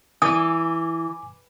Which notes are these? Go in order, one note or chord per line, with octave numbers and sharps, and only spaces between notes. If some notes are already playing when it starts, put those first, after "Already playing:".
E3 G#5 D6 D#6